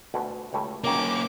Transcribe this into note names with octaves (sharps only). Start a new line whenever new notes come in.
D2 B2 B4
C#2 G3 A3
C#2 F#2 D#3 A#3 C#4 D6